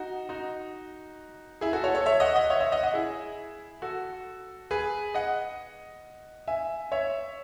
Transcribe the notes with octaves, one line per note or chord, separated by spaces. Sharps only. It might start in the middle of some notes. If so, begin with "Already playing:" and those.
Already playing: D#4 F#4
D#4 F#4
E4 G#4
F#4 A4
A4 C#5
A4 C#5
C#5 E5
D#5 F#5
D#5 F#5
C#5 E5
C#5 E5
D#5 F#5
D#5 F#5
E4 G#4
F#4 A4
G#4 B4
D#5 F#5
E5 G#5
C#5 E5